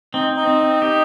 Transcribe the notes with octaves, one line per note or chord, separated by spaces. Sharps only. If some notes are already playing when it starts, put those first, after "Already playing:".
C4 D#4
D#4
C4
G4